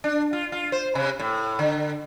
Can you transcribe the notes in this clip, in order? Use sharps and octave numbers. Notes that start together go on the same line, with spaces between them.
D4
F4
F4
C5
C3
A2
D3